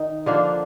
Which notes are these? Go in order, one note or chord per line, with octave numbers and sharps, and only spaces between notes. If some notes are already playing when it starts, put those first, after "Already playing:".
Already playing: D#3 D#4
D3 F3 A#3 D4